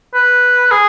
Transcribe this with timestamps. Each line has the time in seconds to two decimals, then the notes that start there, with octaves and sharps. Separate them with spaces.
0.14 B4
0.71 G#4